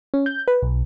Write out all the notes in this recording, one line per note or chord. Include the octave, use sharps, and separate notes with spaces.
C#4
G6
B4
B1